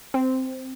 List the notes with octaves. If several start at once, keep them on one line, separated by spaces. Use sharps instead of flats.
C4